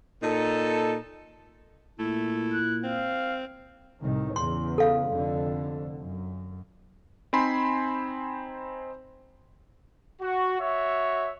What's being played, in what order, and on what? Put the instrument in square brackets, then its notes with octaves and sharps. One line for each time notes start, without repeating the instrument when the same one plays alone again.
[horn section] A#2 D#4 A4
[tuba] A#2 [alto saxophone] A3 [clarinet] E4
[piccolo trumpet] F#6
[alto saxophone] C4 [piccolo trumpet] F5
[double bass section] C2 A2 D#3
[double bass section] E2 C#3 [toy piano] C6
[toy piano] A4 F5
[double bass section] F1 F2 D3
F#2
[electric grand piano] C4 D#4 C5 G#5 B5 C6
[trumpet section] F#4
F#4 C#5 E5